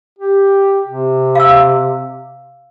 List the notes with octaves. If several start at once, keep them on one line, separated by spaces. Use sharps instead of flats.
G4
C3
F5 E6